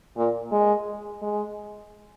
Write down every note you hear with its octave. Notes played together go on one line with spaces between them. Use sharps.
A#2
G#3
G#3